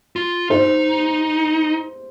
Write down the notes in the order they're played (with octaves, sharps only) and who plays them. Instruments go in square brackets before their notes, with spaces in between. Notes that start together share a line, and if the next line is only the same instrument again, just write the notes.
[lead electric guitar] F4
[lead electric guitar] D#4 [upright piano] C5